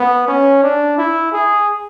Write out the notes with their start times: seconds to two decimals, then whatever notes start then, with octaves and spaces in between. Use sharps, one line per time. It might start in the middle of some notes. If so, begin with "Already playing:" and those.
Already playing: B3
0.28 C#4
0.63 D4
0.98 E4
1.33 G#4